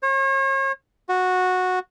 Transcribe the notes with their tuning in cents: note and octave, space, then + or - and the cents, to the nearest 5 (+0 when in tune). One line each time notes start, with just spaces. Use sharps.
C#5 -40
F#4 -10